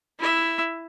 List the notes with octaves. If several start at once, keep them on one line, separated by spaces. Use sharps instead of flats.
E4 E5